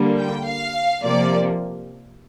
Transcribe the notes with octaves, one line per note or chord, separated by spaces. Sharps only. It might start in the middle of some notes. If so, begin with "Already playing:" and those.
Already playing: D3 G3 A#3
G5
F5
C3 F3 A#3 D5